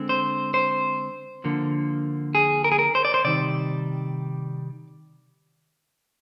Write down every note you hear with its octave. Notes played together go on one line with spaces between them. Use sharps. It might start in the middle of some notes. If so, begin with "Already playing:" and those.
Already playing: D3 G#3 C4
C5
C5
D3 F3 A#3
G#4
A#4
G#4
A#4
C5
D5
C5
C3 D#3 G3 D5